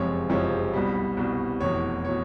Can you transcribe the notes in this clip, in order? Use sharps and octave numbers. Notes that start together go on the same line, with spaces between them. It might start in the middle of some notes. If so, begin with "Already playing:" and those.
Already playing: F#1 F2 C3 F3 G#3 C#5
F#1 F2 C3 F3 G#3 C#5
C2 B2 G3
C2 B2 G3
F1 E2 B2 C#5
B2 C#5